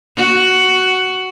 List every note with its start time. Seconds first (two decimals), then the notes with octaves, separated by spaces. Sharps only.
0.17 F#4